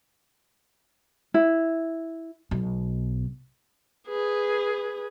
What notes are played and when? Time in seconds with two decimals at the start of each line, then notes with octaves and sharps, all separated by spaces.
1.34 E4
2.51 B1 B2
4.07 G#4 B4